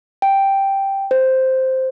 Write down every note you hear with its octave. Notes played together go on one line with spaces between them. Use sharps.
G5
C5